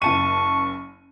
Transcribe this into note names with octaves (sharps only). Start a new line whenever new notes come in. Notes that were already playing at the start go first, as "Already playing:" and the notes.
F#1 A5 C#6 D#7